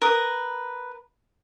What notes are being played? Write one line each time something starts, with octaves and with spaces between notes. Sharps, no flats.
A#4 B4 D#6